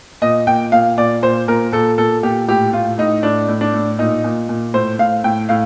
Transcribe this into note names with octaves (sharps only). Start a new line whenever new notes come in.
A#2 D#5
A#2 G5
A#2 F5
A#2 D5
A#2 C5
A#2 A#4
A#2 A4
A#2 A4
A#2 G4
A2 G4
A2 F4
A2 D#4
A2 D4
A2
D4
A2
A#2 D#4
A#2
A#2
A2 C5
A2 F5
A2 G5
A2 F5